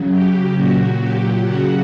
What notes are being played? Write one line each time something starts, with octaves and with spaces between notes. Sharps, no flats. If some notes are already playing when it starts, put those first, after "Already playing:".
Already playing: C#3 F#3
G4
A#2 F#3 F#4
G4
C#3 F#3 F#4